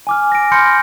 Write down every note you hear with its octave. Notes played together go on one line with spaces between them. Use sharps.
G#5 D6 F6
A#6 D7
B5 C6 F6 G6 A#6 C#7